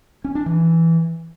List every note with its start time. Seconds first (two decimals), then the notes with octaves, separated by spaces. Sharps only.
0.24 C#4
0.35 D4
0.46 E3